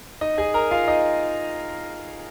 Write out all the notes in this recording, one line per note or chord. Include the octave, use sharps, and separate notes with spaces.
D#4 D#5
G#4 G#5
A#4 A#5
F4 F5
D#4 D#5